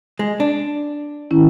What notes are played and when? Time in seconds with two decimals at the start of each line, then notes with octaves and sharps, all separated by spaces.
0.19 G#3
0.40 D4
1.31 D#3 C#4 E4